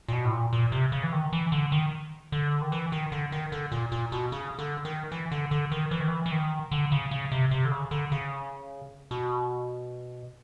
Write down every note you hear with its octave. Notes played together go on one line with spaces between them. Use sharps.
A#2
B2
A2
A#2
A#2
C3
C#3
E3
D#3
E3
D3
D#3
D3
D#3
E3
D#3
D3
D#3
D3
A#2
A#2
B2
C#3
D3
D#3
E3
D3
D3
D#3
E3
D#3
E3
E3
D#3
D3
C#3
C#3
C3
C3
D3
C#3
D3
C#3
B2